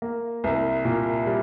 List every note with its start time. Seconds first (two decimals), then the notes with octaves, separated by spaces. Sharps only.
0.02 A#3
0.44 C2
0.85 A#2
1.26 G3